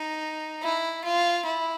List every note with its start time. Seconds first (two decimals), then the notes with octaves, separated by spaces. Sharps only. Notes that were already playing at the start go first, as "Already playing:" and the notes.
Already playing: D#4
0.63 E4
1.04 F4
1.45 E4